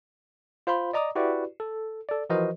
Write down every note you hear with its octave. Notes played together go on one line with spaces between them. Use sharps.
F4 C5 F5 B5 C6
D5 D#5 A#5 D6 D#6
E4 F#4 G4 B4 D5
A4
A4 D5
E3 F3 F#4 A#4 C5 D#5